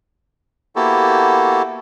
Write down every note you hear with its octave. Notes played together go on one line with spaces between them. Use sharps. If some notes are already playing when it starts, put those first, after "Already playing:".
A#3 B3 E4 F#4 G4 A4